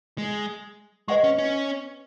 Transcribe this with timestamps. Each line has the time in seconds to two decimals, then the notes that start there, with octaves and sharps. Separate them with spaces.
0.18 G#3
1.08 G#3 B4 D#5 F#5 C#6
1.24 C#4
1.38 C#4